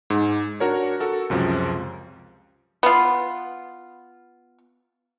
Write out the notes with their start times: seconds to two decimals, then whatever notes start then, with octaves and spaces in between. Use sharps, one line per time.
0.10 G#2
0.60 D4 F#4 A#4 C#5
1.00 F#4 A4 A#4
1.30 C#2 F#2 C3 F3
2.83 B3 F4